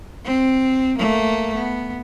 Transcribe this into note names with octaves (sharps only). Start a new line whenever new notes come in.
C4
A3 A#3
B3